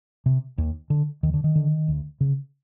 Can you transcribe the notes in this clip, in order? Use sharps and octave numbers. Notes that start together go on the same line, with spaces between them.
C3
D#2
D3
D#2 D#3
D3
D#3
D3
D2
C#3